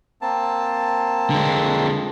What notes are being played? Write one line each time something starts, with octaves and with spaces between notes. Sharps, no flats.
A#3 C4 A5
D3 G#3